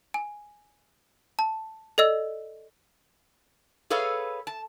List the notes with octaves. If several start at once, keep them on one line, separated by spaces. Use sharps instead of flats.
G#5
A5
A4 D5 D#5 E6
G#4 A4 B4 C#5 F5
A5